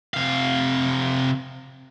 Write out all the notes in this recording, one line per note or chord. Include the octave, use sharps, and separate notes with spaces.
C3 F5